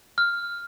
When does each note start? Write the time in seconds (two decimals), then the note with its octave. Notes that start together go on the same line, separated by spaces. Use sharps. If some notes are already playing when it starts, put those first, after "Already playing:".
0.18 F6